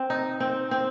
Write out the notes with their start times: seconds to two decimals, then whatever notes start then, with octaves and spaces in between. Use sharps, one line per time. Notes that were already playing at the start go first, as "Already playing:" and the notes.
Already playing: C4
0.10 D#4
0.40 C4
0.71 C4